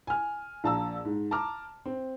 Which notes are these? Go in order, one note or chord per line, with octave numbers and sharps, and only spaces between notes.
G#5 F6
A#1 F5 A5 A#5 E6
G#2
A5 A#5 D6 F6
C4